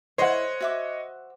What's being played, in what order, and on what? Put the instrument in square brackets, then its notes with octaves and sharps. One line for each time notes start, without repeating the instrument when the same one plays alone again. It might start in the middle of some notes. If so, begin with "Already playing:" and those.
[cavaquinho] E4 C#6 [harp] C5 F#5 [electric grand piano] C#5 D#5
[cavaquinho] F#4 E5 D6